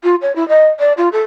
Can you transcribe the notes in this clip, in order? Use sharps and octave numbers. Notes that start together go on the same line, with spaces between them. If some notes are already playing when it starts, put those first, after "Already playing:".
F4
C#5
E4
D#5
D5
F4
A4